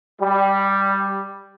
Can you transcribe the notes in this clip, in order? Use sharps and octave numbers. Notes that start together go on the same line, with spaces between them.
G3